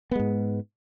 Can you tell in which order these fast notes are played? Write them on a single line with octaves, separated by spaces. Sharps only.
B3 G#3 G#2